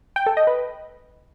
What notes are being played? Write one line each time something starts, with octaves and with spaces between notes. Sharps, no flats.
G5
A4
D#5
B4